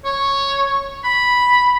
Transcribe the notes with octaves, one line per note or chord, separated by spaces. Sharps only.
C#5
B5